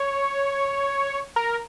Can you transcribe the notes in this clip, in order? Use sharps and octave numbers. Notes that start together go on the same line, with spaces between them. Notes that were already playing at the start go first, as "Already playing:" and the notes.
Already playing: C#5
A#4